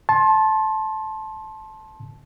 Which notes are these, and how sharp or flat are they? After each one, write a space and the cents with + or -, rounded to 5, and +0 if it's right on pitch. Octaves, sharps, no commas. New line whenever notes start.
A5 -15 C6 +25